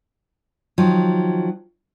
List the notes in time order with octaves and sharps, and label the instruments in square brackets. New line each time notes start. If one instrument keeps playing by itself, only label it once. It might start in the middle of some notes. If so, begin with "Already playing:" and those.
[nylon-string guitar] D#3 F3 F#3